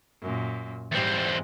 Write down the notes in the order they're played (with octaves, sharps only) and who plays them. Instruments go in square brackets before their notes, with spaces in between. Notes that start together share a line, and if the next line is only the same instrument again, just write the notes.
[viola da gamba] F#2 A#2
[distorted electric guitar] E2 C4 [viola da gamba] G#2 G3 G#3